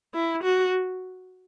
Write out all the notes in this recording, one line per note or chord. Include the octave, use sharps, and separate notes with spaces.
E4
F#4